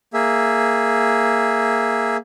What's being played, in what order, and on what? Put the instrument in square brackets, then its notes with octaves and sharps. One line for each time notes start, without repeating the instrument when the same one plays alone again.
[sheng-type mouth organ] A#3 G#4 E5